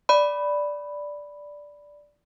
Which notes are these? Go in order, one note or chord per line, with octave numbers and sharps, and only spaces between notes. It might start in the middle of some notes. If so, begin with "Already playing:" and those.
D5 B5